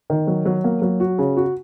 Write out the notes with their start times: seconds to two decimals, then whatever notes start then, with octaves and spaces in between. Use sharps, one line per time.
0.10 D#3
0.27 F#3
0.45 F#3
0.64 A#3
0.82 F#3
1.00 F#4
1.18 C#3
1.37 F#4